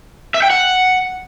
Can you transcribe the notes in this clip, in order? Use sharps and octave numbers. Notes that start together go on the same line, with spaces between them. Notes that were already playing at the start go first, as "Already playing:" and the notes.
E5
G5
F#5